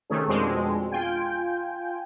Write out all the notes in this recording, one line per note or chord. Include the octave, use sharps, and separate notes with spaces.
C3 D#3 A3 C#4 G#4
F2 B2 G#3 C4 D4
F4 G5 G#5